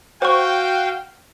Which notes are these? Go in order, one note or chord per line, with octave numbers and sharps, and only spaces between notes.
F#4 C5 F5 G5 C#6